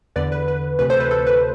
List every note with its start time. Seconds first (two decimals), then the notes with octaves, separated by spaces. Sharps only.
0.16 E2 D3 B4 D5
0.32 B4
0.48 B4
0.79 D2 C3 E3 B4
0.90 A4 C5
1.00 B4
1.11 A4
1.27 B4